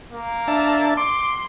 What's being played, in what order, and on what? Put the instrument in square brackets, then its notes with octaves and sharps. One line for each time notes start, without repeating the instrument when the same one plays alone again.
[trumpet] A#3
[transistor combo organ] D4 E5 A5
[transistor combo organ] C6 [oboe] D6